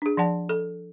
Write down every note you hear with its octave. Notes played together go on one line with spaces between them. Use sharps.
D4 G#4
F3 D5 F#5 A5
A4